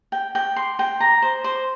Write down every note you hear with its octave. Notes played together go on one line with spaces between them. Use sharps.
G5
G5
C6
G5
A#5
C5
C5